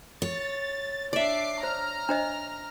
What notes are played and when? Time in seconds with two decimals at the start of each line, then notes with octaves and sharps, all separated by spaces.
0.22 C#5 A6
1.13 D4 D5 E5 D6 C7
1.63 C5 A#5 F6
2.09 D4 C5 D#5